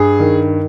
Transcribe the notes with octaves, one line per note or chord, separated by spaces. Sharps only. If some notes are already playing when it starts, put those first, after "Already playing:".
Already playing: G2 G#4
D#3